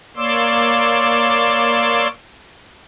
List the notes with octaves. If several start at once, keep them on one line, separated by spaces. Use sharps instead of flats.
A#3 C#5 D5 C6 D6 E6